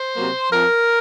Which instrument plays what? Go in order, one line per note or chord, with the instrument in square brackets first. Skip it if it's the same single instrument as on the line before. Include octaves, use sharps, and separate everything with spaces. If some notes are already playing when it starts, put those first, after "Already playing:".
Already playing: [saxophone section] C5
C3 F#3 A#3
F2 A#4